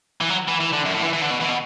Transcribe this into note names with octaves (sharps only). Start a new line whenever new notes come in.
E3
F#3
E3
E3
D3
F#2
A2
E3
E3
D3
B2
E3
B2